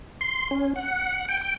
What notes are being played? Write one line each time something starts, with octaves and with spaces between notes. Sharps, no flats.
C6
C#4
F#5
G5
G5